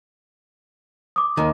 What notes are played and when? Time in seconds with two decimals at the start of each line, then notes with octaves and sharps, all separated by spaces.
1.16 D6 D#6
1.37 D#2 D#3